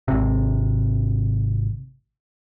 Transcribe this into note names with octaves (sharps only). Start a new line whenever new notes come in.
G#1 C3